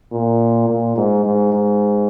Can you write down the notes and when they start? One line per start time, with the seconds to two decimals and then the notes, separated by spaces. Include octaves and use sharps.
0.13 A#2
0.69 A#2
0.96 G#2
1.25 G#2
1.53 G#2